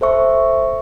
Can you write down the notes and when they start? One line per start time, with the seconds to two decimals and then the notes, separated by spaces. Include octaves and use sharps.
0.01 A4 C5 E5 C#6